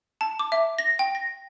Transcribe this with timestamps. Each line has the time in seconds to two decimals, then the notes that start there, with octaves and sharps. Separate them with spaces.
0.21 A5
0.39 D6
0.52 E5
0.79 A#6
0.99 G5
1.15 A#6